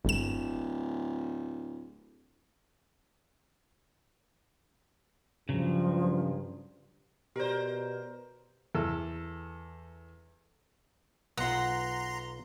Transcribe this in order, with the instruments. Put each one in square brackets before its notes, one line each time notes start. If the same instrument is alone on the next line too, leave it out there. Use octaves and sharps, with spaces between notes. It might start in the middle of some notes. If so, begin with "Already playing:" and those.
[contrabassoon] D1 [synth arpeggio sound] G1 E7
[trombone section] G2 [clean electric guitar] C#3 F#3 [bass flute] F3
[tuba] B2 [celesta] G4 D5 [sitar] A#4 C5
[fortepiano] E2 A4
[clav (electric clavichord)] B1 B3 F4 [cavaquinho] F#5 [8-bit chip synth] A#5 C6